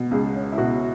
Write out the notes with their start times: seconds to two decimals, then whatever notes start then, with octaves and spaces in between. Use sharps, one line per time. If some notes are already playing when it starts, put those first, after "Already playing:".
Already playing: B2
0.11 C#2 G#4
0.35 C#4
0.52 E4
0.58 B2 F#4